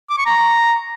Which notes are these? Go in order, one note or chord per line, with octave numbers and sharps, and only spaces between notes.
D6
C#6
A#5